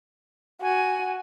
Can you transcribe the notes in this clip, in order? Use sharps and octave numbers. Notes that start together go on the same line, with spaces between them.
F#4 G#5